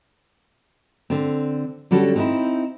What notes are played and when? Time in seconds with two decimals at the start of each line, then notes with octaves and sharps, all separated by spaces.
1.10 D3 C4
1.91 D3 G3 C#4 F#4 A4
2.16 C4 D#4 E4